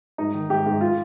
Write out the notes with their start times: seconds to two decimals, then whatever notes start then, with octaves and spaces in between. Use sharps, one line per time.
0.18 G#2 D#4
0.34 D#3
0.50 G#2 G4
0.66 G#2
0.81 F4